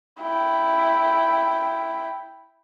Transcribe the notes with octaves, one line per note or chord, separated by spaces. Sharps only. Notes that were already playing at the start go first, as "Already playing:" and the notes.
E4 G5